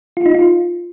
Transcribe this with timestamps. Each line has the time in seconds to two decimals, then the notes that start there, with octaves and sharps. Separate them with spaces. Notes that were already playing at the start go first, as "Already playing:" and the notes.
0.17 F4
0.26 D#4
0.34 F4